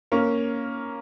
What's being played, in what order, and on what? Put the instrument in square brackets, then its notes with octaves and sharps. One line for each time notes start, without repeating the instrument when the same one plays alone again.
[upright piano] A#3 C#4